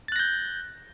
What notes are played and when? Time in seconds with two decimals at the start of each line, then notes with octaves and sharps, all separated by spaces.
0.08 A6
0.12 F#6
0.16 A#6
0.19 G6